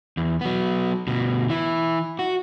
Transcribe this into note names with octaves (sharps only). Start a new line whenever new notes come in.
E2
F#3 B3
D2 B2
E3 E4
F#4